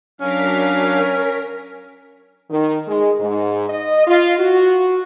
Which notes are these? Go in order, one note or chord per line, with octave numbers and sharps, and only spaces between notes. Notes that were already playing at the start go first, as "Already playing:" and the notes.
F#3 C#4 D4 A#4 F5 B6
D#3
G#3
G#2
D#5
F4
F#4